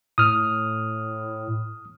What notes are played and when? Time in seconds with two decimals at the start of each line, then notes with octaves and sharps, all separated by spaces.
0.18 A2 D#6 F6